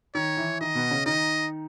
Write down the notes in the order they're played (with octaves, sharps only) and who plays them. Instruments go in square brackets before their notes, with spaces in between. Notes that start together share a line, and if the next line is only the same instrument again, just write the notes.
[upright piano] D#3 [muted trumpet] C#5
[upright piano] E3
[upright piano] D#3 [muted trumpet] D#5
[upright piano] B2 B3
C#3 C#4
[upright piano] D#3 D#4 [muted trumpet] D#5